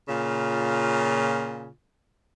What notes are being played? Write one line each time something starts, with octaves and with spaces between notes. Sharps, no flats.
A#2 C#3 F4